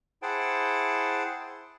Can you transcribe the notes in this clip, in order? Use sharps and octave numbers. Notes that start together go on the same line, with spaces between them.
E4 G#4 C5 F#5 G5 A5